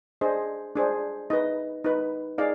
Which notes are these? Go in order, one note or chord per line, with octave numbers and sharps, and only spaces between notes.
D4 G#4 C5 D#5
D4 G#4 C5
D#4 B4 D#5
D#4 B4
D#4 G#4 D5 F5